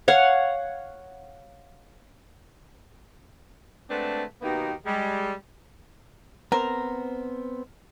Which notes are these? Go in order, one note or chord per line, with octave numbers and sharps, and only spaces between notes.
C#5 F5 F#5
G#3 A3 C4 D4 B4 F#5
B2 D#3 A#3 B3 D#4 G4
G3 G#3
B3 C4 A#4 C5